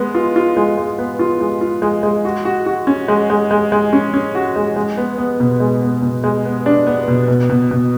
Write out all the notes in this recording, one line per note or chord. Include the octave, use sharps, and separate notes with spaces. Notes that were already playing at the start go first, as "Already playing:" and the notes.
Already playing: G#3 B3
F4
F4
G#3
G#3
B3
F4
G#3
F4
G#3
G#3
F#4
F#4
F#4
C#4
G#3
G#3
G#3
G#3
C#4
C#4
F#4
G#3
G#3
B3
B3
B2
G#3
B3
B2
G#3
B3
D4
B3
B2
B2
B2
B2